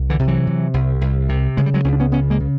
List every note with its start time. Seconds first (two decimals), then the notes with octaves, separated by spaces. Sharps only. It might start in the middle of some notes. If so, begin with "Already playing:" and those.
Already playing: C2
0.10 D3 E3
0.19 C3
0.28 E3 F#3
0.47 C3
0.74 C2
1.01 C2
1.29 C3
1.57 C#3 G#3
1.66 G3
1.74 F#3 G#3
1.84 C#2 C#4
1.93 D4
2.00 B3 C#4
2.12 C#3 B3 C#4
2.30 G#3 A#3
2.40 C#3